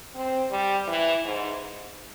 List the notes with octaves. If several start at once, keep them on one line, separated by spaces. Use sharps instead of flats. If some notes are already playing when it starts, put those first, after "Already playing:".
C4
G3
E3
G#2